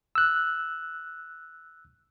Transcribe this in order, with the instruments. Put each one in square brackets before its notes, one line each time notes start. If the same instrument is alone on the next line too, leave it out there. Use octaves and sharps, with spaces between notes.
[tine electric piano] E6 F#6